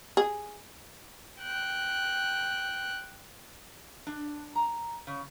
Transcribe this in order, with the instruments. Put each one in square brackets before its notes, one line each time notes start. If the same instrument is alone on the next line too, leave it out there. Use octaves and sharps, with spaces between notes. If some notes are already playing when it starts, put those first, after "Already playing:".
[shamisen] G#4
[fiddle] G5 F#6
[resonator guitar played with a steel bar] D4
A#5
C#3